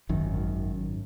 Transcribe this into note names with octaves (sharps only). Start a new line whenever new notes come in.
G#1 F#2 D#3